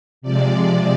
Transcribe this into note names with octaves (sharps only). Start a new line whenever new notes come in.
C3 F3 G#3 D5